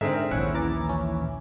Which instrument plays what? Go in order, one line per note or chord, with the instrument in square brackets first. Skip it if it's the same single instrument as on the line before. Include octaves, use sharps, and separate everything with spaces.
[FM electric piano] G#2 D3 [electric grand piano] C4 G#4 E5 [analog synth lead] A#4
[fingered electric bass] A#1 D#2 [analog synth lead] C#4 [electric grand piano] E4 [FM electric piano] F#5
[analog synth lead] E3 [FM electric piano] A#5 D6 A6
[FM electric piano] C#4